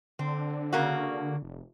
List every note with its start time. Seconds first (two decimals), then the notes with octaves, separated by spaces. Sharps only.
0.19 D3 C4
0.73 C#3 A#3 F#4
1.43 F1